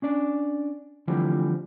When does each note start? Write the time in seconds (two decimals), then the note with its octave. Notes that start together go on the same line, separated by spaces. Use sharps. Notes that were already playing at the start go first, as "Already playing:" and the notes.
0.02 C#4 D4 D5
1.08 D3 E3 F3 G3 A3 C4